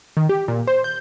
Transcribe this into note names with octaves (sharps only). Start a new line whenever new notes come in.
D#3
G4
A#2
C5
G6